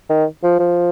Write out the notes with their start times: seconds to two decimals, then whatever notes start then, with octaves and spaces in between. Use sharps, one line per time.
0.09 D#3
0.43 F3
0.59 F3